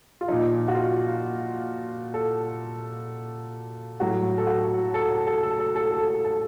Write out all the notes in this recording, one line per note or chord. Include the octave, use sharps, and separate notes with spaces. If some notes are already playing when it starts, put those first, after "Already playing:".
F4
A#2 F3 D#4
F#4
F4
A4
A2 F#3 F#4
A4
F#4
A4
A4
A4
A4
A4
A4
A4
A4
A4